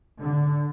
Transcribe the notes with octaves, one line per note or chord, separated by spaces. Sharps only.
D3